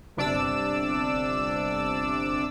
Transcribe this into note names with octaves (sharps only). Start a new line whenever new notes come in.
G1 C3 D4 D5 D6 E6